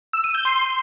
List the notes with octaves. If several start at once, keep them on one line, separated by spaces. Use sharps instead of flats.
E6
D#7
G6
C6